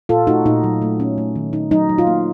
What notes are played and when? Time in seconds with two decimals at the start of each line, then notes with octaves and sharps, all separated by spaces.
0.09 A#2 F4 A4
0.27 A3 D#4 F#4
0.46 A#2 D#4
0.63 F#3
0.82 A3
1.00 C#4
1.18 A3
1.36 D#3
1.53 D#4
1.71 F#3 D#4
1.89 F#3
1.98 F4
2.07 A#3